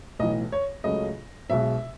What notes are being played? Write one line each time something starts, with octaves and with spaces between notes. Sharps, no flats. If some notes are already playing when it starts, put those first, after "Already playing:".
B1 A2 E3 D#5
C#5
C#2 C#3 F#3 A3 D#5
B1 B2 G#3 E5